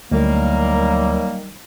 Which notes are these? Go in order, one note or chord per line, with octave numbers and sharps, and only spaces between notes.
D2 D#3 F#3 G3 A#3